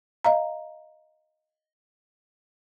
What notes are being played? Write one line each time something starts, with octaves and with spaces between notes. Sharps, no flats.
D#5 F5 A#5